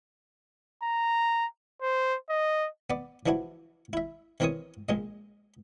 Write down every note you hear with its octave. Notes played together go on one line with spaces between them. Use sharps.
A#5
C5
D#5
B3 D5
E3 F3 D4 E4 F#4
E4 E5
D#3 E3 C4 A#4 C#5 D#6
A#1 G#3 D#5